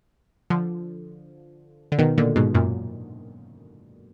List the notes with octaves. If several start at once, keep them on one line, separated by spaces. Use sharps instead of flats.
D3 F3
D3
B2 D#3
A#2 D3
G#2 B2
F#2 A#2